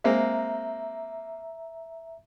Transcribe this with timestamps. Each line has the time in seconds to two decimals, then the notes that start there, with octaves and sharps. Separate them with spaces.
0.04 G#3 A#3 C4 E5 A#5